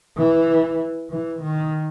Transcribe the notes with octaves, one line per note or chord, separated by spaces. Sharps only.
E3
E3
D#3